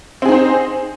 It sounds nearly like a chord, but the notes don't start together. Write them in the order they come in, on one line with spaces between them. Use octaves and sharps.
C4 G#4 D#4 C5